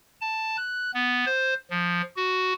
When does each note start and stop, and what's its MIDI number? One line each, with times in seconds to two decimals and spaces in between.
0.21 0.56 81
0.57 0.91 90
0.94 1.25 59
1.26 1.54 72
1.70 2.02 53
2.16 2.53 66